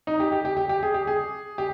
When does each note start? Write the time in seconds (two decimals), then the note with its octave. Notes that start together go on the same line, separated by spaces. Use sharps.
0.07 D#4
0.20 G4
0.32 G4
0.45 G4
0.57 G4
0.69 G4
0.83 G#4
0.94 G4
1.07 G#4
1.58 G4